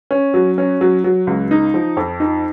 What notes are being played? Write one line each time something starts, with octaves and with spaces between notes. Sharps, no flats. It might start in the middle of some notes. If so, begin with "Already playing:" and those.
C#4
F#3
C#4
F#3
F#3
C#2
D#4
F3
F2
D#4